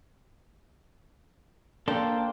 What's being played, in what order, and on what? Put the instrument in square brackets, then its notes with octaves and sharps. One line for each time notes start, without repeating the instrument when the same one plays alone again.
[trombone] A#3 [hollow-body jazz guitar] D4 A4 [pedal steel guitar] C5 G5 C6